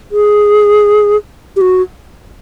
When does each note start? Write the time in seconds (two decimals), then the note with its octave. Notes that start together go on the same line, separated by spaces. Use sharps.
0.12 G#4
1.56 G4
1.61 F#4